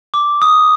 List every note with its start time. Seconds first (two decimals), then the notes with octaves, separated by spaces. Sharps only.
0.14 D6
0.42 D#6